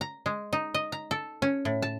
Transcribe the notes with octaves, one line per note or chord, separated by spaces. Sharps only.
A#5
G#3
D#4
D#5
A#5
A4
C#4
A2
A5